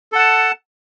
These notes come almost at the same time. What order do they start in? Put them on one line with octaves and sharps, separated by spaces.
A4 F#5 A5